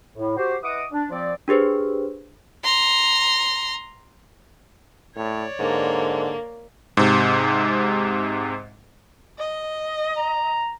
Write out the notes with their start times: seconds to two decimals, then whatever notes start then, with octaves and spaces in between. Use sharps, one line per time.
0.16 A2
0.37 F#4 G4 C5
0.63 E4 B4 D#5 F#5 D6 D#6
0.92 D4
1.10 F3 C4 D5
1.48 D4 G4 G#4 B4 C5
2.64 A#5 C6
5.16 A2 C#5 D5
5.60 G#2 D3 A#3
6.97 G#2 C3
9.39 D#5
10.17 A#5